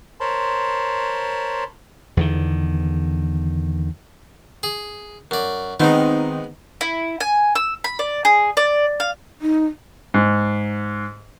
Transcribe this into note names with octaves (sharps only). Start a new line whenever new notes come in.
A#4 C5 C#5 A5 B5 C6
E2 D3 D#3
G#4
F#2 D5
D#3 G#3 B3 C4 D#4
E4
G#5
E6
B5
D5
G#4
D5
F5
D#4
G#2